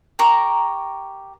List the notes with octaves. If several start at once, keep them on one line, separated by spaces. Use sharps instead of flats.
G4 A#4 A#5 C#6